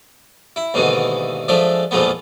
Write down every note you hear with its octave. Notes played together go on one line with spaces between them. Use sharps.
E4
D#2 G#2 B2 D3 E3
F3 G#3 A3 D4 E5
E2 A#2 F3 G#3 A3 B3